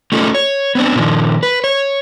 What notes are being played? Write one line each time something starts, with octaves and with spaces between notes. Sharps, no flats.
A3 C#4 D#4 F4 A4
C#5
B3 C4 D4
A#2 D#3 F3
B4
C#5